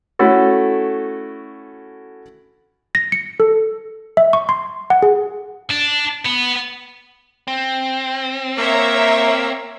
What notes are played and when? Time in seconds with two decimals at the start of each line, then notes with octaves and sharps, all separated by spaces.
0.19 A3 C#4 E4 F#4 A4
2.95 A#6
3.12 C#7
3.40 A4
4.17 E5
4.33 C#6
4.49 C6
4.90 F#5
5.03 G#4
5.70 D4
6.26 B3
7.48 C4
8.58 A#3 C#5 E5 A#5